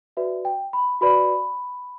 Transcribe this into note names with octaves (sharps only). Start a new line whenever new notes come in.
F#4 B4 D5 E5
G5
B5
F#4 B4 D5 B5